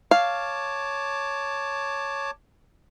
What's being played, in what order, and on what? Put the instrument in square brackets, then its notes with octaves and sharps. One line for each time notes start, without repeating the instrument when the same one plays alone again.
[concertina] C#5 A5 D6 [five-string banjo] F5